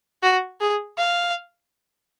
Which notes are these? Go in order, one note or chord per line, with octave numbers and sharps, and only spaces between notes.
F#4
G#4
F5